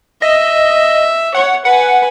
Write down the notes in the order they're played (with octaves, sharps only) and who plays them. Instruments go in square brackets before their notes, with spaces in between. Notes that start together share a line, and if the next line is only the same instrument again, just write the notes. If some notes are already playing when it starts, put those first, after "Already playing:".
[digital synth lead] D#5 [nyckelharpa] E5
[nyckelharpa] C#5 [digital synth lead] F#5
[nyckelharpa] B4 G#5 [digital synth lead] F#5